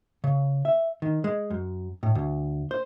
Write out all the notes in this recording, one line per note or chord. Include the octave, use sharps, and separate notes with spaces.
C#3
E5
D#3
G#3
F#2
A2
D2
C5